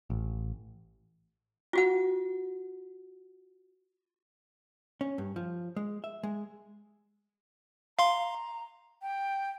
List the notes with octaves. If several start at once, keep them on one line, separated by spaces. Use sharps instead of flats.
A1
F4 F#4 F#5
C#4
G2
F3
G#3
E5
G#3
F5 A#5 C6
G5